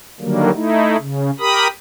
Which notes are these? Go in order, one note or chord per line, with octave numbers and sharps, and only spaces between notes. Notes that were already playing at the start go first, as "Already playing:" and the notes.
D3 D#3 F#3 G3 A#3
A3 D#4 E4
C#3
G4 A#4 B5 D#6